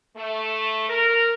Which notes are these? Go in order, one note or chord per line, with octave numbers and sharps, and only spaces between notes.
A3
A#4